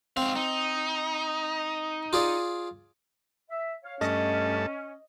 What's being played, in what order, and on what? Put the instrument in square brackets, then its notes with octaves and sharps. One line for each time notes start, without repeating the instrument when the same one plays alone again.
[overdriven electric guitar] G#2 F5 [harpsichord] C4
[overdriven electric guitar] D#4
[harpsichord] F4 G#4 D5
[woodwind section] E5
C#5 F5
[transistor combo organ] G2 A3 A5 [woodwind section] C#4 [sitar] D#5